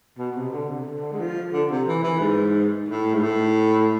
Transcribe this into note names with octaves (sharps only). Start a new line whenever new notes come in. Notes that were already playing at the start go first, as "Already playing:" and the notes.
B2
C3
D3
C3
D3
G#3
F3
D3
C3
E3
E3
G#2
A2
G#2
A2